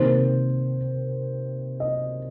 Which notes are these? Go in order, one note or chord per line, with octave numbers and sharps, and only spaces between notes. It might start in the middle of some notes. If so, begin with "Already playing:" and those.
Already playing: C3 D#3 A#3 C5
D#5